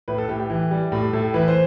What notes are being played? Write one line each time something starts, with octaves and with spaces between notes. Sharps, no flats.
A2 B4
A4
A2 G4
G4
E3
G3
A2 G4
A2 A4
E3 B4
C5